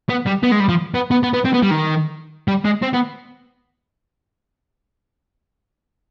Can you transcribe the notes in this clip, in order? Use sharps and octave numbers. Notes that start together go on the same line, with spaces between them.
B3
G3
B3
G#3
G3
F3
B3
B3
B3
B3
C4
B3
G3
D#3
G3
G#3
C4
B3